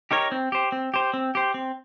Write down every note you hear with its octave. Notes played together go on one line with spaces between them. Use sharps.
D#4 G4 A#4 C#5
C4
G4 C5
C4
G4 C5
C4
G4 C5
C4